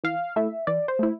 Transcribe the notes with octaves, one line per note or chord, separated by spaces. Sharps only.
E3 F5
A3 E4 E5
E3 D5
C5
A3 E4